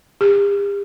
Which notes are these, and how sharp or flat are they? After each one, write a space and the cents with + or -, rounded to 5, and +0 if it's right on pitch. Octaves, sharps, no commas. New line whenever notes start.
G4 +45